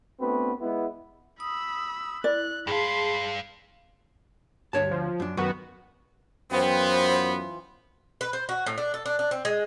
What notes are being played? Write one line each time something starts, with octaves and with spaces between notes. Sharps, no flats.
A3 B3 C4 D4 F#4 B4
G#3 B3 E4
B5 D#6 E6
E4 D5 F#6
G2 G#4 F5 A5 B5 C6
D2 G2 C#5 A5
F3
F#2 D4
F#2 D#3 B3 F#4
F#2 E3 B3 F4 C5 G5
B4
C5
F#4
A2
D4
A4
D4
D4
C4
G#3